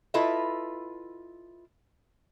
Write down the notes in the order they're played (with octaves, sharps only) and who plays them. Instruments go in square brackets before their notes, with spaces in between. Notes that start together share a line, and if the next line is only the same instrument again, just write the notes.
[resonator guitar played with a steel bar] E4 F4 A4 B4 D#5 E5